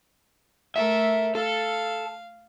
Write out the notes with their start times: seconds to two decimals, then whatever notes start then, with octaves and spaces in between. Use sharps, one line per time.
0.76 A3 A4 A#4 E5
1.35 A4 F5